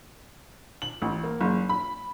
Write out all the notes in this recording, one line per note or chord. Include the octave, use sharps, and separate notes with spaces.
F#7
A1
A#3
F#1
B5